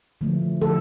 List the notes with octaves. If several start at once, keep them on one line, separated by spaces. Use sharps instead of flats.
D3 F3 A3
D3 F3 A3 A4